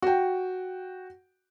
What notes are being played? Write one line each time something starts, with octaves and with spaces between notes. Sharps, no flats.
F#4 G5